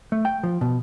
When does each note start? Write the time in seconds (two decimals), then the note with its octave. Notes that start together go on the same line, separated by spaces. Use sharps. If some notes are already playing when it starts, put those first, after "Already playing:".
0.12 A3
0.25 G5
0.43 F3
0.61 B2